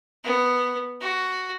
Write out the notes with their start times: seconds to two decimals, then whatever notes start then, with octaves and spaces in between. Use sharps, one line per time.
0.25 B3
1.01 F#4